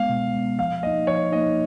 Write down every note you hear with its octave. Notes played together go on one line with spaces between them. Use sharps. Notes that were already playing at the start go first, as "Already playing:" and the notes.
Already playing: G#3 B3 F5
B2
G#3 B3
F3 F5
A#3 D#4 D#5
F3 C#5
A#3 D#4 D#5